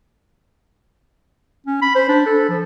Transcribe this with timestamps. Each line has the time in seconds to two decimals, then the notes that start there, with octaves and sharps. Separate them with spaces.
1.66 C#4
1.82 B5
1.95 C5
2.09 D4
2.26 A4
2.49 F3